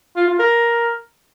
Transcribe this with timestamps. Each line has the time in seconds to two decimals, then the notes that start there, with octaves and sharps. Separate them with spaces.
0.16 F4
0.28 F4
0.39 A#4